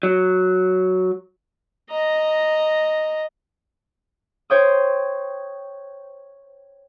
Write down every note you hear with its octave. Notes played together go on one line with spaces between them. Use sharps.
F#3
D#5 A#5
C5 C#5 G5 D#6